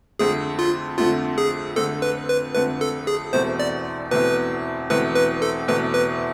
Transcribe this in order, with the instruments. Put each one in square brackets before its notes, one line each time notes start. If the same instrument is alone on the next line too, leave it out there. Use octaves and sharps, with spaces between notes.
[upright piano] F2 D3 A3 C4 [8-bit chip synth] G#4
[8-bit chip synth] F4
[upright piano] F2 D3 A3 C4 [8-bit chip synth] F4
[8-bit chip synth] G#4
[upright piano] F2 D3 A3 C4 [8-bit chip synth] A4
[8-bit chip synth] B4
B4
[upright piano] F2 D3 A3 C4 [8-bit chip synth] B4
[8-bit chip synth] A4
G#4
[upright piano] E2 B2 A3 C4 E4 [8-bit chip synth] C5
[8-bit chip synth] D5
[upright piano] E2 B2 A3 C4 E4 [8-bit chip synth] B4
[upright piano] E2 B2 A3 C4 E4 [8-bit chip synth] B4
[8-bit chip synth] B4
A4
[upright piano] E2 B2 A3 C4 E4 [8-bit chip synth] B4
[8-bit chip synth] B4